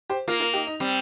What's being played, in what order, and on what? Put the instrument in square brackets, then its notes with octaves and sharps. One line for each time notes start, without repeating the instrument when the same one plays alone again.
[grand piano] G4 C5
[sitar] A#3 [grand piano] F4 A#4
[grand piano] F4 A#4
D#4 G4
D#4
[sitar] G3 [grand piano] C4